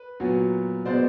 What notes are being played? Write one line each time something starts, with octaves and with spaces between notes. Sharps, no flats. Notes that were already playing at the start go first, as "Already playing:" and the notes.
Already playing: B4
A#2 F#3 B3
B2 G#3 B3 C5 D5